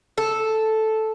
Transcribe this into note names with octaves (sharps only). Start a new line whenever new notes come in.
A4